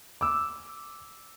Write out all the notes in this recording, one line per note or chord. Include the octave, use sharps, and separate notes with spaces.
D6 E6